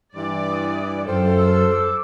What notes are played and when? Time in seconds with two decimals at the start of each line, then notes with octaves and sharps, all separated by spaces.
0.15 G2 E3 D5
0.51 D#6
1.07 F#2 F4 A4 C5 G5
1.38 E6
1.71 D6